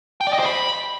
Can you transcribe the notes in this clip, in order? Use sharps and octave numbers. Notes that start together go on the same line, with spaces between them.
G5
D5
D#5
C5
B5